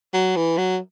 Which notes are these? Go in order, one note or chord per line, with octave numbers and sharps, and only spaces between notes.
F#3
E3
F#3